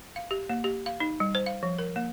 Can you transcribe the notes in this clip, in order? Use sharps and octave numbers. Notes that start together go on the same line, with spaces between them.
F5
G4
A#3
G4
F5
D#4
G3
C5
F5
F3
A#4
A#3